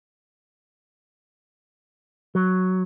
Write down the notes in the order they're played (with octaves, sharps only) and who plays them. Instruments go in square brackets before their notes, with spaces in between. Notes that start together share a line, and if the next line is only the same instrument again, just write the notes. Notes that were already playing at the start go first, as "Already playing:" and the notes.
[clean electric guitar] F#3